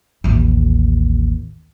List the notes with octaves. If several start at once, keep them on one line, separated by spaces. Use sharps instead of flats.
A1 D#2